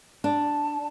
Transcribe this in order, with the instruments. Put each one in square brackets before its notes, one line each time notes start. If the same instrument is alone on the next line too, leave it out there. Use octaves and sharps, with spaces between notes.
[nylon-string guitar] D4 [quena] A5